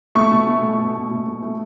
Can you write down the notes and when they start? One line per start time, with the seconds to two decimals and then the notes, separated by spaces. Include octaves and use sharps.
0.15 A3 C#6
0.31 B2
0.47 B2
0.63 A3
0.79 B2
0.95 A3
1.11 B2
1.27 A3
1.42 A3